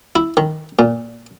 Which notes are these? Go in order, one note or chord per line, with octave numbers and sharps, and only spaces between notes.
E4
D#3
A#2